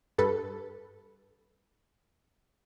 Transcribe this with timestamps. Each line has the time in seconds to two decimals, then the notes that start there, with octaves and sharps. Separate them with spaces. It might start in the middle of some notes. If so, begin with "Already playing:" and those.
0.18 G2 A4 B4